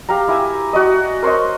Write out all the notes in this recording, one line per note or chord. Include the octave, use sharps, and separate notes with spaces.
G4 F5 G5 A#5
E4 G4 G#5 E6
F#4 D5 D#5
A#4 C5 C#5 D#5